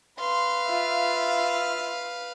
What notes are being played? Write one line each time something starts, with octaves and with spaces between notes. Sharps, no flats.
B4 F5 C6
F4 E5